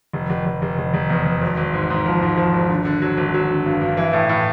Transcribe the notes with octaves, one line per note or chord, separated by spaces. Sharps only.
F1
F1
F1
F1
F1
F1
E2
E2
G#1
G#1
G#2
G#2
F3
G#2
F3
G#1
D3
D3
F#3
G#1
F#3
D3
G2
G2
E3
A2
A2